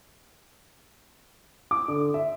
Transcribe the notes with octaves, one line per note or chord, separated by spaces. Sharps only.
D6
D3
E5